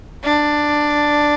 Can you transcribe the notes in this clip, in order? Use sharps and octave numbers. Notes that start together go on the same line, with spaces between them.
D4